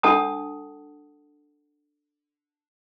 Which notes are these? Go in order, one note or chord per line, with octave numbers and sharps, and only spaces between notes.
D4 A4 F#5 A5 D#6